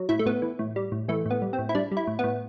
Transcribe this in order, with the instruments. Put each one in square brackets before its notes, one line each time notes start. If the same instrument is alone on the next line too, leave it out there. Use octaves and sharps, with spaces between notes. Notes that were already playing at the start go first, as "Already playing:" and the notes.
Already playing: [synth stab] F#3
A2 E4
A3
A2 B3
E3
A2
G3
A2
E3 A3
A2 B3
G3
C4
A2
E4
G3 D4
G3
E4
A2
B3
A2